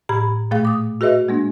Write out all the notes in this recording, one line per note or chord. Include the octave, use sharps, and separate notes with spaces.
A2 G4 B5 G#6
A#2 A3 G#4 F5
D6 D#6
F#4 G#4 B4 D#5 E5
G#3 A#3 D4